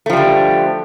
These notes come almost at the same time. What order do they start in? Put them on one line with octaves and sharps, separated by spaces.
A3 F3 G3 D3